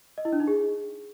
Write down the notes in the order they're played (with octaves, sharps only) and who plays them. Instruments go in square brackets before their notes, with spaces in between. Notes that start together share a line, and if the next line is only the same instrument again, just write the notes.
[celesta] D#5
E4
D4
D#4
G#4